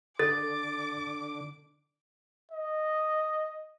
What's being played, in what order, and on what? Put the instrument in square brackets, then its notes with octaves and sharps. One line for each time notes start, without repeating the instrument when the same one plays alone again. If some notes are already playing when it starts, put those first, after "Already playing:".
[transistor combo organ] D3 [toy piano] A4 [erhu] D6 [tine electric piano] A6
[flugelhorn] D#5